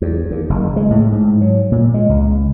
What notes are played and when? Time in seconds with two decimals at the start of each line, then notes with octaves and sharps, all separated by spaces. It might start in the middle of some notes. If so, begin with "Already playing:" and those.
0.02 E2
0.31 D#2
0.50 F#1
0.76 G#3
0.90 A2
1.12 G#2
1.41 F#3
1.72 A#2
1.94 G#3
2.09 C#2